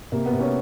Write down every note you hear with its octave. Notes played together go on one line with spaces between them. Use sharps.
C3 A#3
B3
C3
C#4